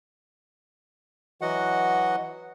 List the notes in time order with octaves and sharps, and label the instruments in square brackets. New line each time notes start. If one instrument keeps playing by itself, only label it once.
[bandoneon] E3 F#3 F#4 D#5 F#5